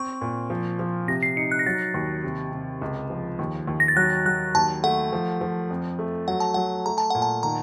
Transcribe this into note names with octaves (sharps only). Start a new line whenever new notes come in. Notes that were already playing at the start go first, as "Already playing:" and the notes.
Already playing: C4 C#6
A#2
F3
F3
C3 A#6
C7
D#4 C#7
F#6
A#6
F#3 A6
D#2
C3
C3
C#2
F3
D#2
D#2
A#6
A6
F#3 F#6
F#3 F#6
D#2 A5
A3 F#5
F3
F3
F2
A3
F#3 F#5
A5
F#3 F#5
A3 A#5
A5
A#2 F#5
A5
D#3 A#5